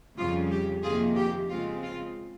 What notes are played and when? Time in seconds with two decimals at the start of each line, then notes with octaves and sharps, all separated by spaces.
0.17 F2 C#3 G3 C#4 F4
0.51 G4
0.83 F2 C3 D#3 A#3 F4 G#4
1.17 G4
1.49 C#3 G#3 C4 F4
1.82 F4